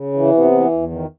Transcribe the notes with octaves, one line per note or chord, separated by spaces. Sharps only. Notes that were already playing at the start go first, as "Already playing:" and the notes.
Already playing: C#3
E3
C3 B3
E3
E2
D#3